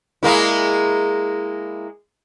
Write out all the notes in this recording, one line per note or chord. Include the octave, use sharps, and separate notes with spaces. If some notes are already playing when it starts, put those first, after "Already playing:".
G#3 A#3 E4